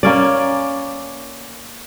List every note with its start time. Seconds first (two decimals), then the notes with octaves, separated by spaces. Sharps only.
0.03 A#3 C#4 D5